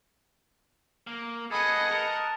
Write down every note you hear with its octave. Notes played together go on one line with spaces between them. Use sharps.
A#3
G#4 A4 B4 D#5 F#5 B5
A#4 A5 D#6